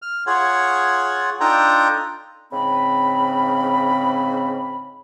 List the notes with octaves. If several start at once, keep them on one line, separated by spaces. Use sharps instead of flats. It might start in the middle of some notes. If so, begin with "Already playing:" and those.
F6
F4 G#4 C#5 F#5
D4 D#4 F4 A4 G5 A#5
G#2 C#3 C4 B5